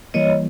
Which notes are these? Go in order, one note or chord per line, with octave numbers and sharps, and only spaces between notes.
E3 G3 A#3 C#5 D#5